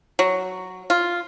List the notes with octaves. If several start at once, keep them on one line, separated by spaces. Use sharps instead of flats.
F#3
F4